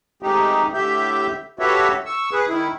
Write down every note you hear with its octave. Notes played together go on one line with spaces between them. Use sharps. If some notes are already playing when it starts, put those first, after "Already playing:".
G#3 A3 C4 D#4 G4
A2 D3 G4 E5 G6
F#4 G4 A4 B4 C#5 E5
C#6 E6
G#4 B4
D#3 E4